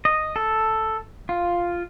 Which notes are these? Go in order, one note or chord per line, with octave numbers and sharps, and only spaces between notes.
D#5
A4
F4